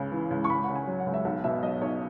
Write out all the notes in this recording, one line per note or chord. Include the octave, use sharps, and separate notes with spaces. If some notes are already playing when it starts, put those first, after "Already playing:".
Already playing: C#2 C#3
E3
C#2
C#6
C#2 B5
C#3 F#5
G#5
F#3
F#5
C#2
E5
B1 F#5
B2 E5
F#3 D#5
B1 C#5